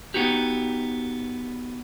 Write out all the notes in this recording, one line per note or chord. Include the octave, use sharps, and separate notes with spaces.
B3 D#4 F#4 G4